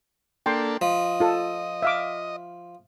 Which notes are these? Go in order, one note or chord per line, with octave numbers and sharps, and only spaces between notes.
A#3 D4 A4 G5 C6
F3 D#5
F4 A4
E5 F5 D6